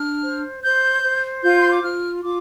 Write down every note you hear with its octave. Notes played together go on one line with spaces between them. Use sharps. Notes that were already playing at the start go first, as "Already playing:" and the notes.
Already playing: D4 F6
C5
C5 G6
C5
F4 G6
C6
D6
F4 F6
F4 D6